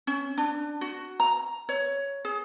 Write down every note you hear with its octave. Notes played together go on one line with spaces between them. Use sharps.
C#4
D4
F#4
A#5
C#5
G#4